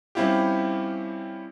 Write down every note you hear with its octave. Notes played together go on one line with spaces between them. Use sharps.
G3 C4 C#4 E4 F4 G4